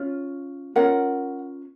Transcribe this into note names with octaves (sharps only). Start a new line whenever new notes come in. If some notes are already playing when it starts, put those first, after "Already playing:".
Already playing: C#4 F4
C#4 F4 A#4 F#5